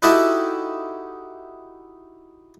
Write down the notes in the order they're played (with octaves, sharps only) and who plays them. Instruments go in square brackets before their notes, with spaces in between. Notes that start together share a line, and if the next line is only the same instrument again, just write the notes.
[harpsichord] D#4 E4 F#4 G4 A4 E5